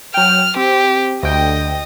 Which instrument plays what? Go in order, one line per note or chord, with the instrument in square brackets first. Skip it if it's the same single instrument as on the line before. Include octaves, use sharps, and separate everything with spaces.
[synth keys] F#3 G5 [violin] F6
[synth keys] C4 [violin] G4
[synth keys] D2 G5 [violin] D#5